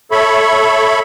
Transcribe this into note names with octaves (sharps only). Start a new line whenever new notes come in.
A4 C#5 E5 B5